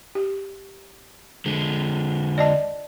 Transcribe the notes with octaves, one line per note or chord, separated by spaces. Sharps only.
G4
D3 G#3
D5 D#5 A5